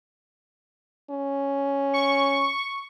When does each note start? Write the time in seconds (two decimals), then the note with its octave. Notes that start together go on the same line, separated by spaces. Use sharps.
1.11 C#4
1.94 C#6